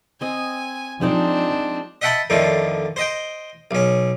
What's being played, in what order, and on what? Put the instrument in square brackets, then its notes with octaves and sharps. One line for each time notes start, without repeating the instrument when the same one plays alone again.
[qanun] C4 D#5 [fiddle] G#5
[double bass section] F3 [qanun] G#3 D#4 D5 [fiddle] C4 D4
[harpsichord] D#5 E5 F#5 G5 A5 B5
F2 A2 D3 D#3
C5 D#5 G5
B1 C#4